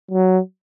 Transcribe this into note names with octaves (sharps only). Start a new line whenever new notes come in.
F#3